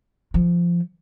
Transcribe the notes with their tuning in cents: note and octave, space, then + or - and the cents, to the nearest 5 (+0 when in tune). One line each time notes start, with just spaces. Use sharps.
F3 -15